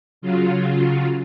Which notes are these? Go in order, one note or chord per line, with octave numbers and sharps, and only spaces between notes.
C#3 F#3 F4